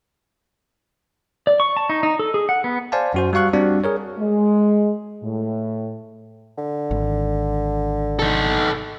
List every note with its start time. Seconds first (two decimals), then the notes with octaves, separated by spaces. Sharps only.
1.47 D5
1.60 C#6
1.77 A5
1.89 D#4
2.03 D#4
2.19 A4
2.34 G#4
2.49 F#5
2.64 B3
2.92 C5 D5 F5 G#5 A5
3.14 F#2 F#4 C5
3.33 G3 F#4 F5 C#6 F#6
3.53 G3 C4 D4 F#4 D5
3.84 G#4 A#4 C#5
4.18 G#3
5.22 A2
6.58 D3
6.91 G#1
8.19 D#4 A4